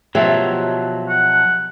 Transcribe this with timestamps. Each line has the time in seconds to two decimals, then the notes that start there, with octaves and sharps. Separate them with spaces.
0.15 B2 F3 F#3 G4 E5
1.09 F#5